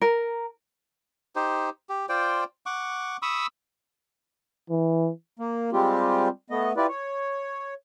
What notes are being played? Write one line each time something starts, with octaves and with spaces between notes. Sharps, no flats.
A#4
D#4 G4 C5
G4
F4 C5 D5 G5
F#5 C#6 D6
B5 C#6 D#6 E6
E3
A#3
G3 G#3 C4 F4 G4
A3 B3 D#5
E4 F4 G4 B4 D5
C#5